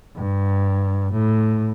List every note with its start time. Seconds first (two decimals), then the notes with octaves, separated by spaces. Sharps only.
0.17 G2
1.13 A2